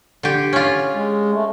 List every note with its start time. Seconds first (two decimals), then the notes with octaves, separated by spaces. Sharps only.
0.23 D3 G4
0.53 C#4 F4
0.94 G#3
1.33 A3